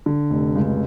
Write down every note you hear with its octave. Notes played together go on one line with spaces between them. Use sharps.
D3
F1
C#2